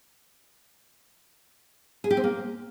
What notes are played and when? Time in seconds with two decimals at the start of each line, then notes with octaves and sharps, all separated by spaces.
2.04 G#4
2.11 G4
2.17 C4
2.24 A#3